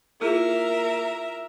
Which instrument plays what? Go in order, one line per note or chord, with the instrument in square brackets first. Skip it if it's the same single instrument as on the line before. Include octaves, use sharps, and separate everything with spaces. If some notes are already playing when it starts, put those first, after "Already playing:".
[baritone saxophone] A#3 [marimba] E4 F4 G#4 [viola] A#4 E5